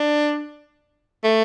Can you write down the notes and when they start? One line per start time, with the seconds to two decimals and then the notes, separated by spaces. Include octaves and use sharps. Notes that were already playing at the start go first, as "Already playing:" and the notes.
Already playing: D4
1.24 A3